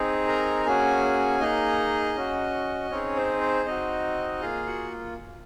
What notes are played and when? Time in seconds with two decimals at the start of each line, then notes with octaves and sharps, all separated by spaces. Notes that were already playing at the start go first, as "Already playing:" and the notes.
Already playing: C4 D#4 G#4
0.28 A#4 A#5
0.65 A#3 C#4 F#4 G#4 G#5
1.40 A#3 D#4 G#4 D#5
2.16 C#4 F#4
2.90 C4 C#4 D#4 G#4 C#5
3.16 C5
3.41 C5
3.66 C4 D#4 F#4 D#5
4.41 A#3 F4 G#4 F5
4.66 F#4 F#5